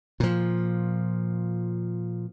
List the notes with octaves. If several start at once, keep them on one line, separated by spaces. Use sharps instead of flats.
A#2 F3